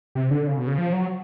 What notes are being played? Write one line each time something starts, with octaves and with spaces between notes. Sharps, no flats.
C3
D3
C#3
B2
C#3
F3
F#3